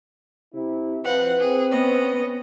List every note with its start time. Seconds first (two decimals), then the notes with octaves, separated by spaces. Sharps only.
0.54 C3 E4
1.04 F3 C4 B4 F#5
1.40 C4 G#4
1.71 B3 C#4 D#5